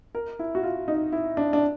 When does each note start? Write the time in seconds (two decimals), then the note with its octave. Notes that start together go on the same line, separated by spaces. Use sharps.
0.15 A#4
0.39 E4
0.55 F#4
0.63 F4
0.88 D#4
1.12 E4
1.37 D4
1.53 D4